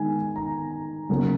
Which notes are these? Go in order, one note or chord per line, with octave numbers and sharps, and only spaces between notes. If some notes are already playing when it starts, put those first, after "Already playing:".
Already playing: D#3 G#3 G#5
A#5
C#3 F#3 A#3